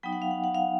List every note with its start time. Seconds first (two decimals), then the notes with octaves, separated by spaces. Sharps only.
0.03 F#3 B3 D#4 G5
0.13 F#5
0.22 F5
0.31 F#5
0.44 F#5
0.55 F5